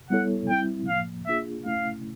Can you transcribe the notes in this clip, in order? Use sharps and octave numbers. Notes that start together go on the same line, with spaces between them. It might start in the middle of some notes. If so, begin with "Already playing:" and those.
G3 B3 E4 A4 C#5 F#5
G3 C4 E4 G5
A2 F3 A#3 F5
A#3 D4 F4 G#4 E5
A3 C#4 E4 F5